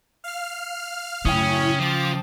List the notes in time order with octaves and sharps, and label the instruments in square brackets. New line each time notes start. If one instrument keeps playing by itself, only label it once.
[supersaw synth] F5 F6
[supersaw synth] F#2 A2 E4 [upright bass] C#3 [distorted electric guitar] C#4 [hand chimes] G5 D#6
[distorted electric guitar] F3 [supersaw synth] D6 A6